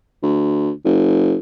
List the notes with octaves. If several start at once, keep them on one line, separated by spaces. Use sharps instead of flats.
D2
F#1